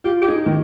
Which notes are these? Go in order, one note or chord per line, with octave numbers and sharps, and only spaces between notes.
F4 G4
G4
D#4 G#4
D#3